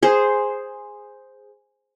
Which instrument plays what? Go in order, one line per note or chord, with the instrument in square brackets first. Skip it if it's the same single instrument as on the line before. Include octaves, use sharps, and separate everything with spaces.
[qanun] G#4 C5